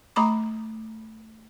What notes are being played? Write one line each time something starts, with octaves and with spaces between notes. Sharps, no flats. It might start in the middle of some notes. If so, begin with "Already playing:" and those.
A3 A#5 B5 D6